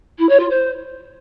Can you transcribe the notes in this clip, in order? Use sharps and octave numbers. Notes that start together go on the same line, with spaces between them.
E4
C#5
F4
C5